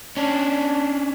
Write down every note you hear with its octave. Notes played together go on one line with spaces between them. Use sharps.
C#4 D4